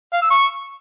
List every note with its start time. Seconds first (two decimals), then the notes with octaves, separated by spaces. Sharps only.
0.13 F5
0.22 E6
0.31 C#6